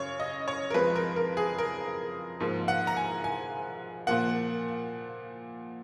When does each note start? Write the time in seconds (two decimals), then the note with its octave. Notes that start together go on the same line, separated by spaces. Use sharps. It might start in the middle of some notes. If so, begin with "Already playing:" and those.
Already playing: F#2 C#3 C#5
0.20 D#5
0.48 C#5
0.70 A#4
0.74 F2 F3 G#3 B4
0.96 A#4
1.16 A#4
1.37 G#4
1.58 A#4
2.40 G#2 F3 A#3
2.68 F#5
2.87 A#5
2.96 G#5
3.24 G#5
4.07 A#2 F3 A#3 F#5